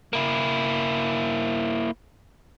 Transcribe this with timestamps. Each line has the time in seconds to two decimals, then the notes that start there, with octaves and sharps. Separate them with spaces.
0.13 A#3 E4